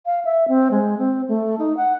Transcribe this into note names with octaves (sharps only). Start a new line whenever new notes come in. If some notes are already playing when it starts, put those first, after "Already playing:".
F5
E5
C4
G#3
C4
A3
D#4
F#5